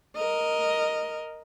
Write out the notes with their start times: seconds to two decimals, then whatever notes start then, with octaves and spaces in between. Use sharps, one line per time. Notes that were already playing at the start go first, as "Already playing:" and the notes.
0.16 A#4 D#5